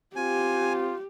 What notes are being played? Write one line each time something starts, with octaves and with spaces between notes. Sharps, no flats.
C4 F4 G4 G#5